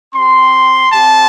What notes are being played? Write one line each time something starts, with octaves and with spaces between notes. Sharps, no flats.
C4 G4 C6
C4 G4 A5